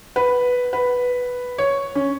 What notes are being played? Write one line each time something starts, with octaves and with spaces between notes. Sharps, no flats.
B4
B4
C#5
C#4